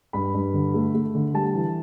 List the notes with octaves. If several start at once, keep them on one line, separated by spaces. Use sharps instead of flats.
G2 B5
G2
D3
A3
A3
D3
G3 A5
E3